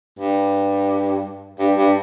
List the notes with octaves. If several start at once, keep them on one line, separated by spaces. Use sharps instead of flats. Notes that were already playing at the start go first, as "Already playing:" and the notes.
G2
G2
G2